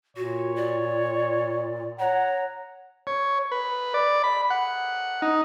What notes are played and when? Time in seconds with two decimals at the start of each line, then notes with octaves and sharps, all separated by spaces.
0.17 A#2 F#4 C#5
0.56 D5
1.99 C#5 F#5 A#5
3.07 C#5
3.52 B4
3.94 D5
4.24 B5
4.50 F#5
5.22 D#4